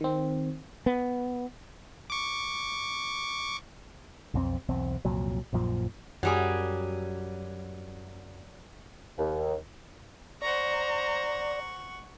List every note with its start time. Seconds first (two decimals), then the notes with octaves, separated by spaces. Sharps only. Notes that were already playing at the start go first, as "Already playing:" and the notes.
0.01 D#3 C4
0.86 B3
2.10 C#6 D6
4.34 B1 F2 C4
4.69 B1 E2 C4
5.05 C2 F2 A#2 F#3
5.53 A#1 F#2 A#2 F3
6.23 F#2 F#3 G3 G#4
9.18 D#2
10.42 C5 D5 F#5 A#5 C#6